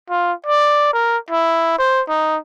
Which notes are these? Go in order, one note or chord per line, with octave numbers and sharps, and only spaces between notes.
F4
D5
A#4
E4
C5
D#4